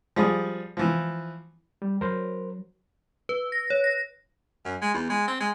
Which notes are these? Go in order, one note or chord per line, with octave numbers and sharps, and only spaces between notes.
F3 G3 G#4
E3 F3
G3
F#3 A#4 C5
B4
A#6
C#5
A#6
F#2
G#3
E2
G#3
C4
G#3